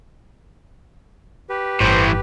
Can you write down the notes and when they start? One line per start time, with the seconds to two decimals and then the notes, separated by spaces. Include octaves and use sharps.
1.50 G4 B4
1.80 G1 A2 E3 C5